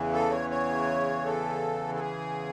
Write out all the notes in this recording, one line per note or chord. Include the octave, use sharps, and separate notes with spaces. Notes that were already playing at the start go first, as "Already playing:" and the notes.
Already playing: E2 C#3 E3
A4
C#5
C#5
A4
A4
G#4